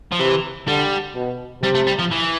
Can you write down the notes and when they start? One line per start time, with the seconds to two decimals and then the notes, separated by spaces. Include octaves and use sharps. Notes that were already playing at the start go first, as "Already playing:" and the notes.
0.12 F3
0.20 C3 E3
0.67 D3 G3
1.15 B2
1.62 C3 G3
1.75 A3
1.87 G3
1.99 F3
2.11 E3